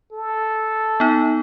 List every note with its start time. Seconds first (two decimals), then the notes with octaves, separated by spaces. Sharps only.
0.12 A4
1.00 B3 D#4